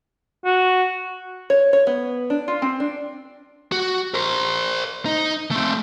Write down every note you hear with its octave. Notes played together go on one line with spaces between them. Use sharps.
F#4
C#5
C#5
B3
D4
F4
C4
D4
F#4
A#4 C5
D#4
A3 C4